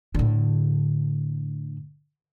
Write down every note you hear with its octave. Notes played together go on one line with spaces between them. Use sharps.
A2 D3